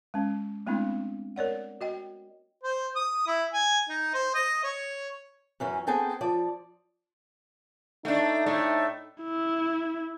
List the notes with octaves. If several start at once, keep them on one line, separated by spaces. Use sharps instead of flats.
G#3 C#4
G#3 A3 B3 C4 D4 E4
A#4 C#5 D5 F#5
F#4 D#5 G5
C5
D#6
E4
G#5
D#4
C5
D#5
C#5
F#2 E3 C#4
B3 C4 G#4 A4 G5 G#5
F3 D5
A3 D4 D#4
A2 A3
E4